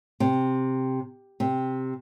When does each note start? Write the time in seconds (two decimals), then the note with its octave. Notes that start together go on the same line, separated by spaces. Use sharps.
0.20 C3
1.40 C3